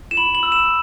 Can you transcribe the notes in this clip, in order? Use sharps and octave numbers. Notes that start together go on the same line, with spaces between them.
E7
B5 F#7
F#7
E6
E7